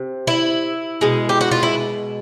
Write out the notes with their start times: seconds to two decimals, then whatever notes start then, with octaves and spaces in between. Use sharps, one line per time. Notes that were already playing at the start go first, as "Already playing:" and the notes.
Already playing: C3
0.27 E4
1.01 B2 G#3
1.29 G4
1.41 F#4
1.51 F4
1.63 E4